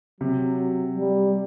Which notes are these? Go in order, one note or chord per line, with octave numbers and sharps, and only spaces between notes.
C3 F#3
G3